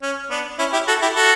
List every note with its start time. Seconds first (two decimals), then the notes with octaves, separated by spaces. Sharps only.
0.02 C#4
0.30 B3 D4
0.59 C#4 E4
0.73 E4 G4
0.88 F#4 A4
1.02 E4 G4
1.15 F#4 A4